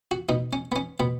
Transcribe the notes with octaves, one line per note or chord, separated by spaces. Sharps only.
F#4
B2 D#4
C#4
B3
C#4
B2 B3